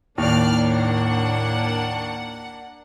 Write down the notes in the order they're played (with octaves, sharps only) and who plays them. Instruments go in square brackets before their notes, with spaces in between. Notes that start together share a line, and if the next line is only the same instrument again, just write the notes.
[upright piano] D#2 [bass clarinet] A2 [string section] A#3 D4 [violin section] D5 F6
[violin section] F#5